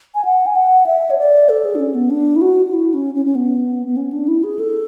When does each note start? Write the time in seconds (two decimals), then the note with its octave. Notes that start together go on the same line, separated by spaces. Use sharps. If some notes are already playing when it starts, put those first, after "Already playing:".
0.15 G#5
0.25 F#5
0.46 G#5
0.56 F#5
0.86 E5
1.10 C#5
1.18 D5
1.49 A4
1.65 G#4
1.75 D4
1.80 C#4
1.95 B3
2.10 D4
2.36 E4
2.42 F#4
2.66 F#4
2.73 E4
2.94 C#4
3.15 C#4
3.25 C#4
3.35 B3
3.87 B3
3.97 C#4
4.12 D4
4.28 E4
4.44 G#4
4.59 A4